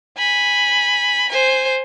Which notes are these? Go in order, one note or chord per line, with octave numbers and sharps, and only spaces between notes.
G#5 B5
C5 G#5